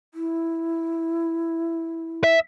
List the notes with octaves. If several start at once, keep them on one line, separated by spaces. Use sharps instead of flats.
E4
E5